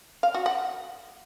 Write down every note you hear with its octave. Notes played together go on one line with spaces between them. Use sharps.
F5
F#4
F#5